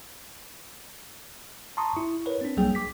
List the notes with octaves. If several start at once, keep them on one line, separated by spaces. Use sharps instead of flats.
A5 A#5 C6 C#6 D#6
E4
A#4 B4 C#5
C4 D4
C2 F#3 G3 A#3 G#4 G5
D6 B6